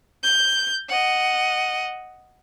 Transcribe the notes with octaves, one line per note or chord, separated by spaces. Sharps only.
G6
D#5 F#5